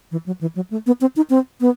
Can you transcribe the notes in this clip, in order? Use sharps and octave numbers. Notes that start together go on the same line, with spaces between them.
E3
F#3
E3
F#3
A3
B3
C4
D#4
C4
B3